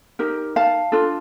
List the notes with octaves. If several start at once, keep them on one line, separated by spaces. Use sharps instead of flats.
D#4 G4 A#4
F5 A5
D4 F4 A4